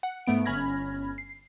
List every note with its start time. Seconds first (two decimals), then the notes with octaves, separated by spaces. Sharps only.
0.03 F#5
0.27 G#2 A3 B3 D7
0.45 G1 C#4 B5 F6 G#6 A#6
1.18 C7